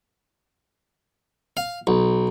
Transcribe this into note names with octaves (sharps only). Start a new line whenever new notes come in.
F5
B1